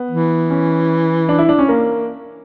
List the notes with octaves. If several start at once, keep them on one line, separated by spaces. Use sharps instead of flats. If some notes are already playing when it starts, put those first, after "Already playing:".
Already playing: B3
E3
C#4
D4
E4
D4
C#4
A#3